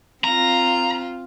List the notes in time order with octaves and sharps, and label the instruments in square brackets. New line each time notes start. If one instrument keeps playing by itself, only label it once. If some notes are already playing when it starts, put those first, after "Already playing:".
[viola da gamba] C4 F4 [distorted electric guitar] A#5